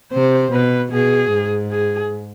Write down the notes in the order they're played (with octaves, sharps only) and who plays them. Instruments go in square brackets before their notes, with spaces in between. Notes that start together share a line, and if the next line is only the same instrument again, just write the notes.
[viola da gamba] C3 [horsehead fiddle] C5
[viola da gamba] B2 [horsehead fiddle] B4
[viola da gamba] B2 [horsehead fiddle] G#4
[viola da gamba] G#2
[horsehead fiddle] G#4